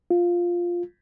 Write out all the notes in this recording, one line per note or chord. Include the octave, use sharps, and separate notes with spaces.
F4